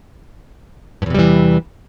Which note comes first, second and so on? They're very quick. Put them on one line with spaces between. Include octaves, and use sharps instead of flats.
G2 E2 C3 G3 E3